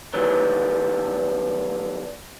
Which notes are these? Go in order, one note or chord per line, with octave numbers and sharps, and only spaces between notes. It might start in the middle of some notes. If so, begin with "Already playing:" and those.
B1 D#3 E3 F#3 G3